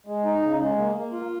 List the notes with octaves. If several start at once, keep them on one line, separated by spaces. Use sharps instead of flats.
G#3
D#4
C#3
G#3
A#3
A#3
F4